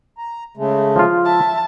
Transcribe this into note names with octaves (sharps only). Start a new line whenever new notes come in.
A#5
C#3 G#3 A3
F3 F4
E5 A5